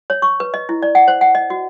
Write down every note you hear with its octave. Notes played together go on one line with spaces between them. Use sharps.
C#5
C#6
B4
D#5
E4
D5
F#5
C5
F#5
D#5
F#4